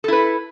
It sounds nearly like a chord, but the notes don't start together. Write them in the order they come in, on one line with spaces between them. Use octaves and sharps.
A4 E4 B4